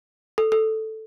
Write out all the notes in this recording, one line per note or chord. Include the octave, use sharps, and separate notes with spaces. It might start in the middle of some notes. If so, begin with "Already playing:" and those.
A4
A4